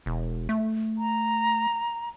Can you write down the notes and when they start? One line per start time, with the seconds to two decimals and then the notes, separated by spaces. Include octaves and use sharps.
0.06 E1
0.49 A3
0.98 A#5